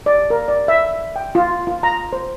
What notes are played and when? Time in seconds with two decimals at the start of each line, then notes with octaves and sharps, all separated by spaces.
0.06 D5
0.30 A#4
0.48 D5
0.68 E5
1.16 G5
1.35 F4
1.67 F4
1.83 A#5
2.13 C5